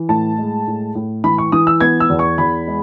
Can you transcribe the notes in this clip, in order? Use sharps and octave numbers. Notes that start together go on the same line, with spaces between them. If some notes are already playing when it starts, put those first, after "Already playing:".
Already playing: E3
A2 A5
G#3
A2
A2
E3 B5
C#6
E3 D#6
E6
B3 G#6
E6
E2
C#6
E2 B5
G#3